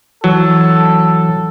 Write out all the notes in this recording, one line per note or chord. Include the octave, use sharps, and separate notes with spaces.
E3 F#3 A4